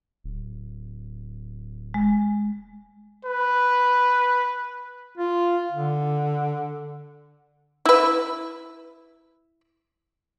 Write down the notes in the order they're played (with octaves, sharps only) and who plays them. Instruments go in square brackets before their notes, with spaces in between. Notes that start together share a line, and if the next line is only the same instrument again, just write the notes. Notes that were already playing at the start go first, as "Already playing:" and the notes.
[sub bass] D1
[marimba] G#3
[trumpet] B4
[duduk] F4
D3
[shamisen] E4 B4